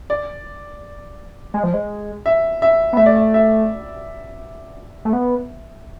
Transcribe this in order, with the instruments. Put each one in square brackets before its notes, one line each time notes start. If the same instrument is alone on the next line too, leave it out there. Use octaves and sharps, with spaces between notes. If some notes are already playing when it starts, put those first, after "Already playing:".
[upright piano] D5
[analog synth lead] G#3
F3
G#3
[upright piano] E5
E5
[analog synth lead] B3
[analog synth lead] A3 [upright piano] E5
[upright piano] D5
E5
E5
[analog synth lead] A3
B3